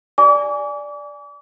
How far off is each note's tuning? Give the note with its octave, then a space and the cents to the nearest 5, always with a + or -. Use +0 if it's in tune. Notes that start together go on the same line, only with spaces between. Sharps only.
D5 +0 G#5 +0 D6 -40